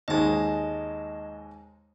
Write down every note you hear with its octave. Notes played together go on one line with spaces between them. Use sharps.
D#2 G#2 G#3 D#5 A5